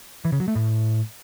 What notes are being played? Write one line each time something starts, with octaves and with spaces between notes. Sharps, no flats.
E3
C#3
F#3
A3
A2